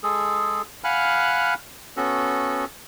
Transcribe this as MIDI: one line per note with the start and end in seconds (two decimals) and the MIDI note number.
0.03 0.62 56
0.03 0.62 68
0.03 0.62 69
0.84 1.54 77
0.84 1.54 78
0.84 1.54 80
0.84 1.54 83
0.84 1.54 89
0.84 1.54 90
1.97 2.65 59
1.97 2.65 61
1.97 2.65 66
1.97 2.65 69